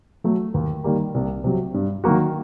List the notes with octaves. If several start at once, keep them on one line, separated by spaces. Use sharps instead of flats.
F#3 A3
D#2
D#3 G3 A#3
C2
C3 F#3
G2
D#3 F#3 A#3 F#4